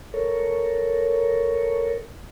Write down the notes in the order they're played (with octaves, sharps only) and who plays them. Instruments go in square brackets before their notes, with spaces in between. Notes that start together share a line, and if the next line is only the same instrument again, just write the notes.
[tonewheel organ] A4 A#4 C#5